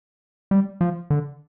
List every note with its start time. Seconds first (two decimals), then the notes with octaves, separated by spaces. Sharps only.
0.51 G3
0.81 F3
1.10 D3